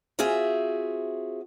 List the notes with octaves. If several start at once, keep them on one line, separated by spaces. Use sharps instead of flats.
C4 F4 F#4 G#4 E5